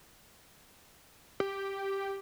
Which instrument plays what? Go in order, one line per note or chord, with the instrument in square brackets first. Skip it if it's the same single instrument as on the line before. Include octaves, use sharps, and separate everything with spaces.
[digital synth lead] G4